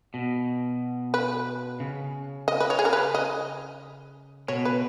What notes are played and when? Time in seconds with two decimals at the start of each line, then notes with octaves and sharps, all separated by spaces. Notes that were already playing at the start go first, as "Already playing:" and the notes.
0.14 B2
1.14 B4
1.80 C#3
2.48 D#5
2.60 B4
2.70 C#5
2.79 G#4
2.85 A#4
2.93 B4
3.15 D#5
4.48 B2 C#5
4.65 B4